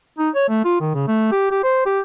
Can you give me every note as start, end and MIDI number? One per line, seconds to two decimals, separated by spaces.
0.18 0.30 63
0.35 0.48 73
0.49 0.61 57
0.65 0.77 65
0.81 0.92 51
0.94 1.06 49
1.08 1.31 57
1.32 1.51 67
1.51 1.60 67
1.64 1.85 72
1.86 2.00 67